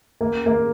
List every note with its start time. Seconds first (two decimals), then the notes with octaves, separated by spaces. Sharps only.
0.21 A#3
0.46 A#3